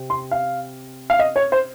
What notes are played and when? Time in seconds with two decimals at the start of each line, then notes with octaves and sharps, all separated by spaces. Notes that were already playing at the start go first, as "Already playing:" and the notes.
Already playing: C3 C4
0.10 C6
0.31 F5
1.10 F5
1.19 D#5
1.36 C#5
1.52 C5